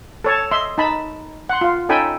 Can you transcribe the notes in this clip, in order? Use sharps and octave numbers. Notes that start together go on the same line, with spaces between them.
A4 C#5 A5
D#5 E5 C6
D#4 A5 B5
F#5 C6
F4 F5
C#4 D#4 A4 G5 G#5 B5